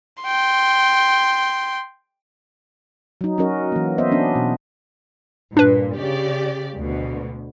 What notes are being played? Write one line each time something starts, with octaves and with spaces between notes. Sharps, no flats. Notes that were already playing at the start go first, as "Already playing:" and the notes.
G5 C6
F#3 D#4
F#3 C#4 F#4 A#4 D#5
E3 A#3
B3 C5 D#5 E5
B3 C#4 D4
B2
G2 A#2 D4 B4
C#3 G4 D5
D2 B2